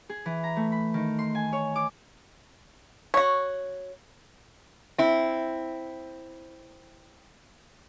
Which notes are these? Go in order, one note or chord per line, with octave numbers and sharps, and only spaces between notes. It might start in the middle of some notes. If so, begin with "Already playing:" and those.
G#4
E3
A#5
A3
B5
D#3
C6
G#5
C#5
D6
F#4 C#5
C4 E4